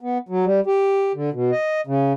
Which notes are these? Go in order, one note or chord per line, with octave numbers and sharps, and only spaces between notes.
B3
F#3
G3
G4
D3
B2
D#5
C#3